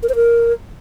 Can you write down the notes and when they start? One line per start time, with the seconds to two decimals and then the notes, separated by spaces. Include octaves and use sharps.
0.03 A#4
0.09 C5
0.16 A#4